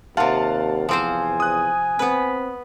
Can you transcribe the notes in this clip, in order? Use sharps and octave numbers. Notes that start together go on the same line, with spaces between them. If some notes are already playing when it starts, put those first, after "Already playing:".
D#2 C3 F4 F5 F#5 A5
E2 F3 C4 C5 G#5
D#6 F#6
B3 C4 B4